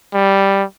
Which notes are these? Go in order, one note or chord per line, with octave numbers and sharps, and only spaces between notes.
G3